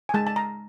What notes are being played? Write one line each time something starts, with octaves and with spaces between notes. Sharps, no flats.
G#5
G#3 A5
A5
A#5